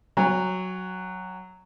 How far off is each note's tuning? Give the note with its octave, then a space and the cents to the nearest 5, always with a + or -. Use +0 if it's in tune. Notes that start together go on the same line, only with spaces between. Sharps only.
F#3 +0 G#5 -45